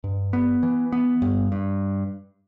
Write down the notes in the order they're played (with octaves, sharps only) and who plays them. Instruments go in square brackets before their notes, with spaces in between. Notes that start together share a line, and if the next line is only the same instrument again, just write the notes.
[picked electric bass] G2
B3
E3
B3
G2
G2